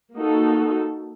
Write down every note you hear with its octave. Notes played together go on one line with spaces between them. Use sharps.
A#3 D#4 F#4 A4